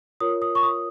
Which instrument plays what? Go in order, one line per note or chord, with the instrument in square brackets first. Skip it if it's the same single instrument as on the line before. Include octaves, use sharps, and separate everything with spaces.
[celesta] F4 A#4 C#5 D#6
D#6
C#6
D#6